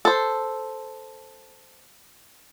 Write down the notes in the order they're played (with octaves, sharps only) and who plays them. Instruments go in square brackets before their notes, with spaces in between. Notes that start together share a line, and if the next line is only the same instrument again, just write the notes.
[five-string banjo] A4 C5